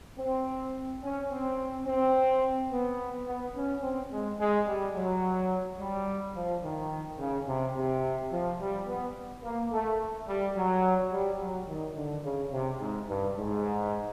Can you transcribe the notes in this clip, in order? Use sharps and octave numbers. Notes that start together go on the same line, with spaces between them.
C4
C#4
C4
C4
B3
B3
C#4
C4
G#3
G#3
G3
F#3
G3
F3
D#3
C#3
C3
C3
F3
G3
B3
A#3
A3
G3
F#3
G3
F#3
D#3
D3
C#3
C3
G#2
G2
G#2